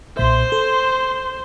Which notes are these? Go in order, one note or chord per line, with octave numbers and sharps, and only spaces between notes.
B1 A#2 C5 E5 C6
A4